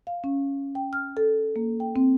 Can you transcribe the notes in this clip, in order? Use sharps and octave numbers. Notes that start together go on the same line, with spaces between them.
F5
C#4
G5
F6
A4
A#3
G5
C4